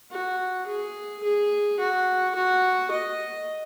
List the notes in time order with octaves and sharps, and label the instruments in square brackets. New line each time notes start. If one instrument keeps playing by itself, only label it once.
[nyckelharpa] F#4
G#4
G#4
F#4
F#4
D#5